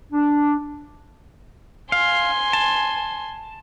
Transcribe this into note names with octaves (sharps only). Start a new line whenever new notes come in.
D4
F5 G#5 C6
A5